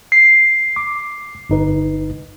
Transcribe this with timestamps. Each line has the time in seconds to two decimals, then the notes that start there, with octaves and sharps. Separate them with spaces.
0.12 C7
0.76 D6
1.50 G1 D#4 B4